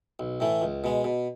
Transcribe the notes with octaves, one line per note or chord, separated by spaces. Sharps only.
B1
A2 E3 A3
C#2
B2 G#3
B2